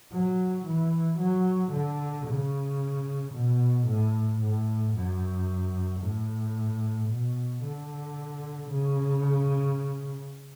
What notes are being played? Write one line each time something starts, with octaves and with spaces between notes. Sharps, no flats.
F#3
E3
F#3
D3
C#3
B2
A2
A2
F#2
A2
B2
D3
C#3